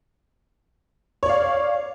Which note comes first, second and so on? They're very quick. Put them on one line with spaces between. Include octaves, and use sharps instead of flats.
C#5 D5 F5